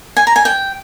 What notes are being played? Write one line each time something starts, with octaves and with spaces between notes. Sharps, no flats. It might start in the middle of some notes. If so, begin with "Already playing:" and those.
G#5
A#5
G#5
G5